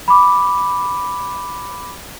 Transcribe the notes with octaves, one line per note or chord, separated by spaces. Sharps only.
B5 D6